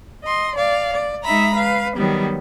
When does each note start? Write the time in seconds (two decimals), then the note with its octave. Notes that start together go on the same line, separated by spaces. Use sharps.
0.24 D#5 C6
0.55 D5 F5
0.92 D5
1.23 G#3 D#4 E5 A#5 B5
1.54 B4 F5
1.95 D#3 F#3 G3 B3